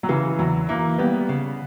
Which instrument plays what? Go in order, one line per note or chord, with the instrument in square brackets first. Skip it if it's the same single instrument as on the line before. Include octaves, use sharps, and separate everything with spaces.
[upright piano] F#3
[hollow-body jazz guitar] C#3 [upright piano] E3
[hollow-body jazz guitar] E2 [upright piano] F#3
[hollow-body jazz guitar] E3 [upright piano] A#3
[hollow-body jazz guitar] G3 [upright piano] B3
[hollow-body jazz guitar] C#3